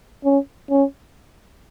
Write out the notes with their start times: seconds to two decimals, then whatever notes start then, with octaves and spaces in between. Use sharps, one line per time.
0.25 C#4
0.70 C#4